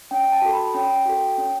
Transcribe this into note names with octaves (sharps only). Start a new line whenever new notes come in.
C#4 G5
A5
F#4 A4
B5
C#4 G5
F#4 A4
C#4